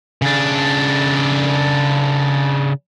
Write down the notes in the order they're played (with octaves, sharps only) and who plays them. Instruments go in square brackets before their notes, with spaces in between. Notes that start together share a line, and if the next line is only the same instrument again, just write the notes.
[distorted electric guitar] C#3 D4